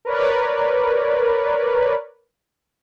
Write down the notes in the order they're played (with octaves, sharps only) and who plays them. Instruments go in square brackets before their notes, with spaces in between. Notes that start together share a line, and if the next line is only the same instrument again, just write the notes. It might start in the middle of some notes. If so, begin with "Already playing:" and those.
[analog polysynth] A#4 B4 C#5 D5